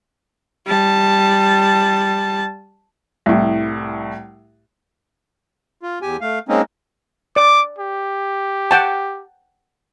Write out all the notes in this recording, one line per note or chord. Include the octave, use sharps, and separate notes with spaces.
G3 A5
C2 A2
F4
E2 G4 G#5
A3 F5
G#3 A#3 C4 C#4 D#4
D5 D6
G4
F#5 G5 A5